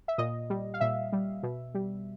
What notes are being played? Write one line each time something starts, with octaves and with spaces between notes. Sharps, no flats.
E5
A#2 D#5
G3
F5
A#2 E5
G3
B2
G3